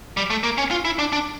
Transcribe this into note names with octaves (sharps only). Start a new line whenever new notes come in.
G3
A3
A#3
C#4
F4
E4
D4
D4